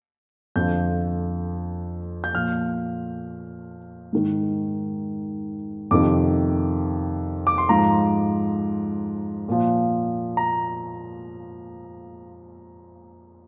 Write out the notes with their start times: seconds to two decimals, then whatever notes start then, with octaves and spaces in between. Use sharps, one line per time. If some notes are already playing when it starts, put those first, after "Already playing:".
0.56 F2 D3 F3 G6
2.24 G6
2.34 A#2 F3 F6
4.13 G#2 D#3
5.91 F2 C3 D#3 D6
7.47 D6
7.58 C6
7.69 G#2 F3 A#5
9.48 A#2 F3
10.37 A#5